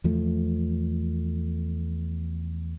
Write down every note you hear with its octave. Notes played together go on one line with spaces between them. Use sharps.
E2 F3 A3